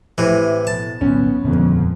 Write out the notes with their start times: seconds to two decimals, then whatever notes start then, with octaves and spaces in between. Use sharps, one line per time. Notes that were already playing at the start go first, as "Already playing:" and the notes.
0.18 A2 C3 E3
0.67 B2 A5
1.01 D1 B1 A2 B3 C#4
1.44 D#1 F2 G#2 D3 F3 B3